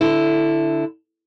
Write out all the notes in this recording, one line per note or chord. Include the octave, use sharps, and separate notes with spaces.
D3 E4